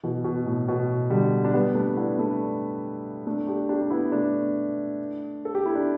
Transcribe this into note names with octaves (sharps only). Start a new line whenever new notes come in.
B2 E3
B2
A2
B2
D3 G3
D4
G3 B3
A3 D4
B3 E4
A3 D4
A3 D4
D4 G4
D4 G4
D4
B3 E4
A3 D4
A4
G4
E4
D4